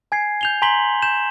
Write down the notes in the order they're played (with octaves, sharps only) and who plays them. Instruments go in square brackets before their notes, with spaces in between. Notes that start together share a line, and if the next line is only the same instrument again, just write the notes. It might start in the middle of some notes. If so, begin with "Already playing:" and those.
[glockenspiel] G#5 G#6 C7
G6 F7 G7
G#5 A#5 C6 B6 F#7 G7
G6 E7